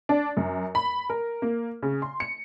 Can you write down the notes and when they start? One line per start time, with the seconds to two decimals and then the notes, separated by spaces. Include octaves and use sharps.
0.09 D4
0.37 F#2
0.75 B5
1.10 A#4
1.42 A#3
1.83 C#3
2.02 C6
2.20 C#7